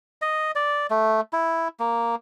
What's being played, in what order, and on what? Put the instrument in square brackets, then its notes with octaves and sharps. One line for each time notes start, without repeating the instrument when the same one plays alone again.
[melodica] D#5
D5
A3
E4
A#3